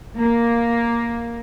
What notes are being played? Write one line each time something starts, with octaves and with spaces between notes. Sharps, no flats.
A#3